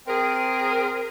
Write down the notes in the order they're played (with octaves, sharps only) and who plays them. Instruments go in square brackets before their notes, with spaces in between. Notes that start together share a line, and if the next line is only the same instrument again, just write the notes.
[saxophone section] C4 G#4 A#4